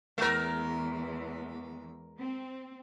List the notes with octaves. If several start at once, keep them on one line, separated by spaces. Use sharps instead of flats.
E2 E3 G#3 A#4
C4